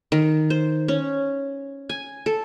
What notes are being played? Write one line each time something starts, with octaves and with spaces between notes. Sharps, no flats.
D#3
C5
C#4
G#5
A4